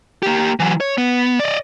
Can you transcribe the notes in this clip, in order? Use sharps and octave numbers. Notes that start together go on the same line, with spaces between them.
A#3 G4
E3 F#3
C#5
B3
D5 D#5